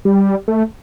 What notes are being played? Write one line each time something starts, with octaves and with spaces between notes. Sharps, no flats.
G3
A3